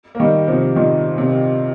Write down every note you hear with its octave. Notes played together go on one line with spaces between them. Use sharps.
A#3
D#3 G3
C3 F3
A#2 D#3
C3